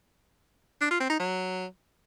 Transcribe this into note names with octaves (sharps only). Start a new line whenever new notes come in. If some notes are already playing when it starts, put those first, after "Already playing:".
D4
F4
C4
D#4
F#3